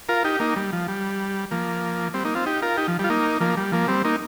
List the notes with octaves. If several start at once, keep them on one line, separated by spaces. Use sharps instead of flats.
F4 A#4
D#4 G4
A#3 D#4
G3
F3
G3
F3 A#3
G3 C4
A#3 D#4
C4 F4
D#4 G4
F4 A#4
D#4 G4
F3
G3
F4
A#3 D#4
F3 A#3
G3
F3 A#3
G3 C4
A#3 D#4